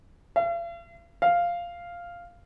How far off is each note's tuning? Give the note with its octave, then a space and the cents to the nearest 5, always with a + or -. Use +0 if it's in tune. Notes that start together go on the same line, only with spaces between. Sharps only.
F5 -45
F5 -5